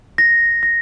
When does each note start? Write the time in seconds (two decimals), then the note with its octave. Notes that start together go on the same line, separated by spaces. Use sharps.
0.18 A#6
0.63 A#6